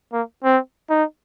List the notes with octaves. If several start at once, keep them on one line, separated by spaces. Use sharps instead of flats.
A#3
C4
D#4